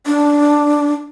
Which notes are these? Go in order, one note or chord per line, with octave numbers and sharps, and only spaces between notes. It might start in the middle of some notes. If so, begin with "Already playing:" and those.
D4